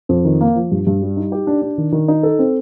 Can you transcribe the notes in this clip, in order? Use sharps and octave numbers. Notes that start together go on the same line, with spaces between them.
F2
D#3
A#3
F3
G2
G2
G3
D#4
G4
D4
D4
D#3
D#3
D#4
A4
C4